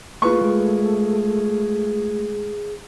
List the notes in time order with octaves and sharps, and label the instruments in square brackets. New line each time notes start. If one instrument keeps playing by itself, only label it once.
[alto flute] A3 [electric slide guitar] A#3 A4 [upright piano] F4 B4 C#6 [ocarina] G#4
[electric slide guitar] G#3 A#4 [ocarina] G#4